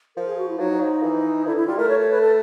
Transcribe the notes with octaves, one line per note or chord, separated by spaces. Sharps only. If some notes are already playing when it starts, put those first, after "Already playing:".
F3 A#4
G#4
F#4
E4
F#3 D#4
F3
E3
D3 E4
E4
G3 F4
A3 A#4
C#5
C#5
B4
A4